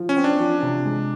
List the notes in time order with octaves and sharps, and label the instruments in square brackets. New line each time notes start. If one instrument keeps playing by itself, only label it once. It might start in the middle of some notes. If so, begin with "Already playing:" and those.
Already playing: [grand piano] F3
[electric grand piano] C#4
[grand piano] C4
[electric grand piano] D4
[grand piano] F3
C3
G#3